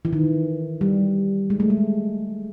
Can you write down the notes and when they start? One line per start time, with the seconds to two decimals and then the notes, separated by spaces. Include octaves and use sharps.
0.05 E3
0.13 D#3
0.81 G3
1.50 G#3
1.60 A3
1.70 G#3